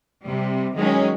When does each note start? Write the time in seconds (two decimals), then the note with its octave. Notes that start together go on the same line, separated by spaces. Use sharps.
0.24 C3 G3
0.77 D#3 F#3 G#3 C#4